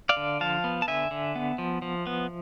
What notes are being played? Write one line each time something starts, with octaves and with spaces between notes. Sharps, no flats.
D5 F5
D3
F3 F5 A5
B3
A5
D3 E5 G#5
D3
B3
F3
F3
B3